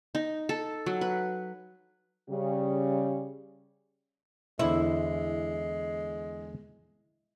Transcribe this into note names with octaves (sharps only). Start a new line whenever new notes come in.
D#4
A4
F#3
B4
C#3 G3
E2 D3 G#3 E4 C5